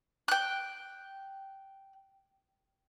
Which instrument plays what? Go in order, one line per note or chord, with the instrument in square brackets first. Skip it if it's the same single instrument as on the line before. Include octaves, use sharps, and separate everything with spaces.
[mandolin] G5 F#6